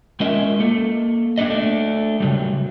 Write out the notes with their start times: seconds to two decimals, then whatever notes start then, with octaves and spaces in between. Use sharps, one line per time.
0.20 G#3 C#4 F4 A#4 D#5 E5
0.60 A#3 A4
1.38 A#3 D4 D#4 A4 D#5
1.50 A3 D4
2.20 C#3 F#3 G3